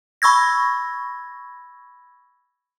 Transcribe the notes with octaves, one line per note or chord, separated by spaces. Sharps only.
B5 C#6 E6 G#6 A#6